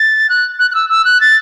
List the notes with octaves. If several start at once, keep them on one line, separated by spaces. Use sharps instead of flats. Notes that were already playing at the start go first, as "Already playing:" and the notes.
Already playing: A6
F#6
F#6
F#6
E6
E6
F#6
A6